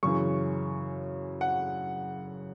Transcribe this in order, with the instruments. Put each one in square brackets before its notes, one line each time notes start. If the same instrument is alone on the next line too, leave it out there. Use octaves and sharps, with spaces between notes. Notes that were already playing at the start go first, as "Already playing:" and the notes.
[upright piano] F#2 C#3 E3 C#6
F#5